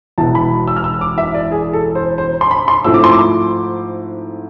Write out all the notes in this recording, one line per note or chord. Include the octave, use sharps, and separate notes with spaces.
E1 E2 B2 B3 E4 A5
B5
E6
F6
E6
D6
E5
D5
G#4
A4
C5
C5
C6
B5
C6
G#2 F3 A3 C4 E4 E6
D6
C6
D6